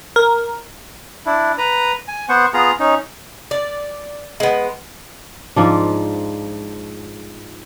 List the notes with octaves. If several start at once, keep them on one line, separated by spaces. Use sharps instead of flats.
A#4
D4 E4
B4 A#5
G#5
B3 C5 F#5 C#6
B3 F4 G#4 A#5
C#4 D#4
D5
G#3 B3
G#2 F3 D4